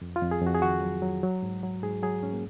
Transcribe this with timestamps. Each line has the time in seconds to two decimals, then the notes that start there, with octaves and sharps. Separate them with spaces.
0.01 F2
0.16 F4
0.22 F2
0.31 G#4
0.42 F2
0.47 F#4
0.55 G#4
0.62 D#3 F#4
0.81 F#3
1.02 F#3
1.23 F#3
1.43 G#2
1.63 F#3
1.83 G#2 G#4
2.03 F#3 G#4
2.23 G#2 C#4
2.33 A#3